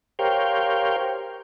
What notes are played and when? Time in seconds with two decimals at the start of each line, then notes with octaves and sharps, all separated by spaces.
0.19 G4 A#4 C5 C#5 F5 G5